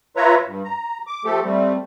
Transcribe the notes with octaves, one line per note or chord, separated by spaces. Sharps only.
F4 B4 C#5 E5 A#5
G2
A#5
D6
F3 A3 G4 A4
G3 A3 C4